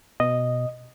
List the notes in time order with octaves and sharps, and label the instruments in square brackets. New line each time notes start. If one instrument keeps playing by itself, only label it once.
[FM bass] B2 [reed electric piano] D#5